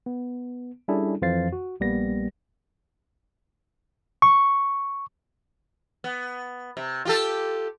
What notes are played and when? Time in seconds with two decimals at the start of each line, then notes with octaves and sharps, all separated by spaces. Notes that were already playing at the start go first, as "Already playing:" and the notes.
0.06 B3
0.88 G3 C#4 D4 E4 G#4 A4
1.22 F2 E3 C5 F5 A6 C7
1.52 F#4
1.80 A#1 G3 A#3 B3 A#6
4.22 C#6
6.04 B3
6.77 C3
7.05 F4 G4 A4